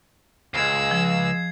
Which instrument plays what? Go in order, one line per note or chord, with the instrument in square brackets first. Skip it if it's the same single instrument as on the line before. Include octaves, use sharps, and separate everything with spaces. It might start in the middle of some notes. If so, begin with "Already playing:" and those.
[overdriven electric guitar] C#2 [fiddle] G#3 E6 [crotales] G#6 C7
[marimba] F3 [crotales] G#6